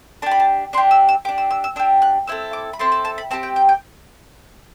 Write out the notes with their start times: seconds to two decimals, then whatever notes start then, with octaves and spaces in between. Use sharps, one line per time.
0.22 D4 G4 A5
0.31 B5
0.40 A5
0.73 D4 C6
0.78 G4
0.91 E6
1.09 E6
1.25 G4 D6
1.29 D4
1.38 E6
1.51 E6
1.64 E6
1.76 D4 G4 E6
2.02 F#6
2.27 C4 E4 A4 E6
2.53 D6
2.73 B5
2.79 C4 E4 A4 C6
2.92 A5
3.05 A5
3.18 B5
3.31 C4 G4 A5
3.43 G5
3.56 G5
3.69 G5